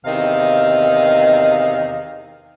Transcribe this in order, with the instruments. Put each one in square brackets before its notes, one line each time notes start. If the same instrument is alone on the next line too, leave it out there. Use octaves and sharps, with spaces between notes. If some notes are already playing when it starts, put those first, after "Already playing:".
[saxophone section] E2 C3 D#3 D#5 F5